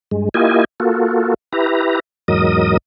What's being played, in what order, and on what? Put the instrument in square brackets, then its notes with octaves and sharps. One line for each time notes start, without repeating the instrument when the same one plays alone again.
[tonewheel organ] G2 G#3
A#3 E4 F4 G4 D#5 G#5
A#3 F4 F#4 A4
E4 G4 B4 A#5
E2 G#2 F#3 A#4 D#5 D#6